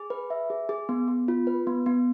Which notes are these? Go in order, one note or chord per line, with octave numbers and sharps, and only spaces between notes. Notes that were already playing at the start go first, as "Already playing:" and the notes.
Already playing: G#4
B4
E5
G#4
G#4
B3
B3
F4
B4
B3
B3